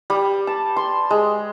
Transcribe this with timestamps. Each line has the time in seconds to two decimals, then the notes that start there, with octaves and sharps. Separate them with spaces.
0.10 G3
0.47 A5
0.76 C6
1.10 G#3